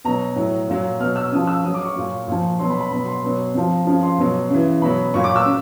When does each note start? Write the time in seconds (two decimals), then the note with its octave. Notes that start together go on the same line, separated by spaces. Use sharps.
0.04 B2 F#3 A#5
0.36 A2 F#3
0.68 A#2 F#3
1.00 B2 F#3 F6
1.16 E6
1.32 C#3 F3 D#6
1.47 E6
1.64 C#3 F#3 D#6
1.74 D6
1.85 C#6
1.96 A#2 F#3
2.28 A#2 F3
2.59 B2 F#3 C6
2.70 B5
2.81 B5
2.91 B2 F#3 B5
3.06 C6
3.23 B2 F#3
3.54 C3 F3
3.87 C#3 F3
4.03 C6
4.18 B2 F#3
4.50 C#3 E3
4.82 B2 F#3 B5
5.14 A#2 F#3 C#6
5.24 D6
5.36 E6
5.45 C#3